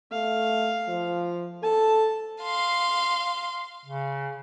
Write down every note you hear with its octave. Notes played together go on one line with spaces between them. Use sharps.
A3 F5
F3
A4 A5
F5 C6
C#3